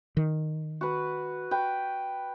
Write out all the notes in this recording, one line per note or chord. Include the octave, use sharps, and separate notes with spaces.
D#3
F#4 B4
B4 G5